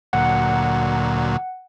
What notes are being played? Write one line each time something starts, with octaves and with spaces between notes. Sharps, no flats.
D2 A#2 F#3 F#5